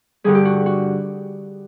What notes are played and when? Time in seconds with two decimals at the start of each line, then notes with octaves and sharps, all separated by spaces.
0.24 G2 D3 G3 G#4
0.35 G4
0.45 F#4
0.66 F#4